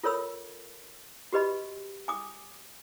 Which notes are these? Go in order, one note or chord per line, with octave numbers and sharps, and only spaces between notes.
F4 A4 A#4 C#5 B5 E6
F#4 G4 B4 D#5 B5
G#5 D6 D#6